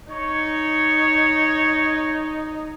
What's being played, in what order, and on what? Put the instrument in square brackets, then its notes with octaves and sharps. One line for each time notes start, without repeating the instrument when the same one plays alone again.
[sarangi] D#4 [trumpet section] C#5